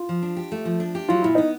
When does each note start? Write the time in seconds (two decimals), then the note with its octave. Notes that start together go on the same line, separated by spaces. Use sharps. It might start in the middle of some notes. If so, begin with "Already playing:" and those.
Already playing: F4
0.09 F3
0.23 D4
0.36 G4
0.52 A3
0.65 F3
0.80 D4
0.95 G4
1.09 F#3 F4
1.22 A#2 E4
1.35 B3 D#4